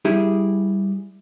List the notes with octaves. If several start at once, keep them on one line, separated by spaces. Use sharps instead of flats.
G3 E4 G4 G#4